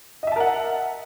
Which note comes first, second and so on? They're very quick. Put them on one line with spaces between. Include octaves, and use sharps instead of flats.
D#5 E5 A5 A#4 F#5